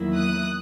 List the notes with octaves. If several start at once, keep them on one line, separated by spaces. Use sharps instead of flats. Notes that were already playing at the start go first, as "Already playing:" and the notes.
Already playing: E2 D#3 F#3 A#3 E4
D#6 F#6